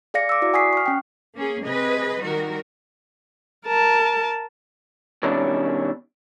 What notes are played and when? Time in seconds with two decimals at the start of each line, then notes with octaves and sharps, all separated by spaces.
0.14 G#4 D5 F5 A#6 C#7
0.29 D6 E6
0.42 E4 F#4 D5
0.53 F#5 G#5 C#6 D#6 B6 C7
0.73 C#6 F6
0.86 C#4 G5
1.35 A#3 C#4 G#4
1.65 C3 G#4 B4 D#5
2.22 D#3 G3 F#4 A#4
3.66 A#4 A5
5.23 B2 D#3 G3 C#4 D4 E4